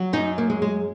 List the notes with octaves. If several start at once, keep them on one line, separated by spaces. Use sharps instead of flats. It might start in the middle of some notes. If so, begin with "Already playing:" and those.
Already playing: F#3
F#2 D#4
A#3
G#3
G#3